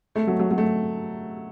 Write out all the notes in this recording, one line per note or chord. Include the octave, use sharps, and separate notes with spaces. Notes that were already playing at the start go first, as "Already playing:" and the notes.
A3
F#3
F#3
F#3
A3